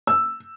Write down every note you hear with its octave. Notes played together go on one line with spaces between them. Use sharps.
E6